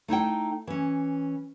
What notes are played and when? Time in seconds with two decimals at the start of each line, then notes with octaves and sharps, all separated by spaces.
0.08 A3 D#4 E4 G5
0.67 E3 C#4